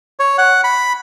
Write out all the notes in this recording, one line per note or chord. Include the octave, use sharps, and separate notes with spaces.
C#5
F#5
B5